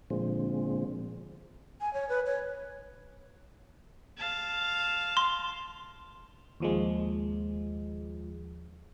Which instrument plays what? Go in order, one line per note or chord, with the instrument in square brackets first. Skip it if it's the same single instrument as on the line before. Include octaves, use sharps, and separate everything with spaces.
[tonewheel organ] A#2 D3 F3 G#3 C4
[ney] G#5
C#5
B4
C#5
[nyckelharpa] F5 A5
[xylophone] C6
[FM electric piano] D#2 F3 G#3